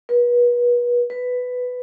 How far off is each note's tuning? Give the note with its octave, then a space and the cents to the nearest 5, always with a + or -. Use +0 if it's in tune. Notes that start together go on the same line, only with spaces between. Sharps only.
B4 -35
B4 +10